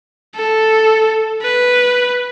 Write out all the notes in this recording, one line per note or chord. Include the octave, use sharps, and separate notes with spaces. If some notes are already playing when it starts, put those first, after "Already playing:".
A4
B4